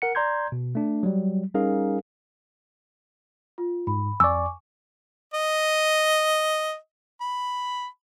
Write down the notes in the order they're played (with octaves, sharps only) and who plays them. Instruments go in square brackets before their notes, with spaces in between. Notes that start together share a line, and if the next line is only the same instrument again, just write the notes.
[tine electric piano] A#4 F#5 C#7
D5 A#5 C6 G6 G#6
B2
A3 D4
F#3 G3
G3 C#4 D#4 G#4 A#4 F5
[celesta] F4
[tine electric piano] G#2 [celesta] B5
[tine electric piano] F2 D5 [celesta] G#5 C#6 D6 [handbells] E6
[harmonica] D#5
B5